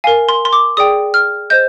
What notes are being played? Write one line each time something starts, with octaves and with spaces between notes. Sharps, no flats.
A#4 F5 G#5
C6
C6
D6
G#4 D5 G5 D#6
F6
C5 D#5 G6